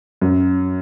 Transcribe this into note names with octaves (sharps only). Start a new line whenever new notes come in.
F#2